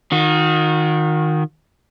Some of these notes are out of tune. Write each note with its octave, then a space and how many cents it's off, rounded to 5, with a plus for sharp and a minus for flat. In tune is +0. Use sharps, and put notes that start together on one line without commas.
D#3 +0 F#4 -40